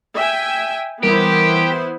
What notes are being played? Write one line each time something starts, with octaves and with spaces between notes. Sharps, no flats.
E5 G5 G#5
E3 G3 B3 E4 G4 A#4 C5